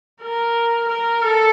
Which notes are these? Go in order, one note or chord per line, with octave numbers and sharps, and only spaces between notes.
A#4
A#4
A4